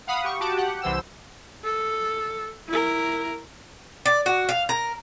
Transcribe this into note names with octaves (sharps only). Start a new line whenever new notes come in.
F5 F#5 B5 D#6
G4 C#6
F#4 G4 A5 D6
G4 F#5
C2 E3 C5 E6 E7
A4
E4 A#4
D5
F#4
F5
A#4